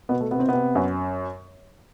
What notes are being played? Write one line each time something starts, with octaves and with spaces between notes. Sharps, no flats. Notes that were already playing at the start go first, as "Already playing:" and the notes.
B2 B3
A3
C3 B3
C4
B3
C3
F#2